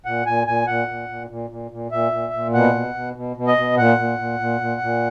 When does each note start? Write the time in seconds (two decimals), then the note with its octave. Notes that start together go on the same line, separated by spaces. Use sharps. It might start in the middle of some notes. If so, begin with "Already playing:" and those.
0.05 A#2 F#5
0.26 A#2 G#5
0.47 A#2 G#5
0.67 A#2 F#5
0.88 A#2
1.09 A#2
1.30 A#2
1.50 A#2
1.71 A#2
1.91 A#2 E5
2.12 A#2
2.33 A#2
2.54 B2 F#5
2.75 B2
2.95 B2
3.16 B2
3.37 B2
3.47 D#5
3.58 B2
3.77 A#2 F#5
3.99 A#2
4.19 A#2
4.40 A#2
4.61 A#2
4.81 A#2